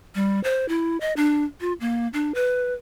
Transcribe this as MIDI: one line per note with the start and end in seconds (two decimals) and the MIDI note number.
0.15 0.42 55
0.44 0.68 72
0.69 0.97 64
1.01 1.13 75
1.17 1.44 62
1.61 1.73 65
1.80 2.08 58
2.13 2.32 62
2.35 2.74 71